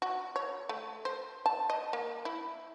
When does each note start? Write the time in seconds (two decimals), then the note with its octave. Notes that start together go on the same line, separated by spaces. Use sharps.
0.02 F#4
0.36 C#5
0.69 A3
1.05 C5
1.46 A5
1.70 D#5
1.93 A#3
2.25 E4